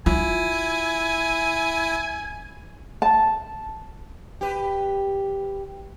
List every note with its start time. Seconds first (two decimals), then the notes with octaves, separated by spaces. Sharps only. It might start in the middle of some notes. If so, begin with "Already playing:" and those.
0.06 E4 F4 G#5
3.02 A5
4.41 G4 B4